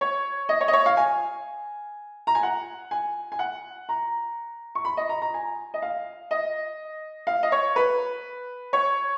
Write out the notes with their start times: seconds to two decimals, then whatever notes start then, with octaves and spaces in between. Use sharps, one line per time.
0.01 C#5
0.49 D#5
0.61 C#5
0.68 D#5
0.73 C#5
0.86 F5
0.97 G#5
2.27 A#5
2.35 G#5
2.43 F#5
2.91 G#5
3.32 G#5
3.39 F#5
3.89 A#5
4.75 C#6
4.85 B5
4.97 D#5
5.09 A#5
5.22 A#5
5.34 G#5
5.74 D#5
5.82 F5
6.31 D#5
7.27 F5
7.43 D#5
7.52 C#5
7.76 B4
8.73 C#5